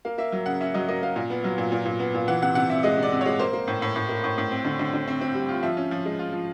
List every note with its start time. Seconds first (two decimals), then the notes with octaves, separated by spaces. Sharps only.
0.05 A#3 F5
0.18 A#3 E5
0.32 F#3
0.46 C#3 F#5
0.61 C#4 E5
0.74 F#3 D#5
0.88 A#3 D#5
1.03 A#3 F5
1.16 A#2
1.30 B3
1.44 F#3
1.58 A#2
1.72 A#2
1.85 A#2
2.00 B3
2.15 A#2
2.28 E3 F#5
2.42 C3 F#5
2.55 C3 F#5
2.69 C3 E5
2.83 G#3 D#5
2.98 C3 D5
3.12 C3
3.21 G#3 C#5
3.39 A#3 C5
3.53 A#3
3.68 A2
3.82 A2
3.96 A2
4.09 A#3
4.24 A2
4.38 A2
4.51 C4
4.65 D3
4.79 D3
4.93 D3
5.08 C4
5.21 C4
5.35 G3
5.49 F4
5.63 F3 E5
5.77 C#4
5.91 F3
6.06 G#3
6.19 F4
6.33 F3